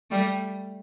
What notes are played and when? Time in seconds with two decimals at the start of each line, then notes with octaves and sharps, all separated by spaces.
0.11 G3 A3